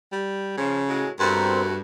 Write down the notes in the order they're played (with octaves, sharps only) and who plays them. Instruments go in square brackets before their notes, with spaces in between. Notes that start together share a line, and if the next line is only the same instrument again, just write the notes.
[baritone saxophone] G3
[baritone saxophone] C#3 [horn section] F3
[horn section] A2 F#3 G#3
[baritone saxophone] G2 [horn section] B2 A3 F#4 [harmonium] C4 A#4 C5